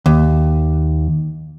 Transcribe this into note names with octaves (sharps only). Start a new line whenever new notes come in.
D#2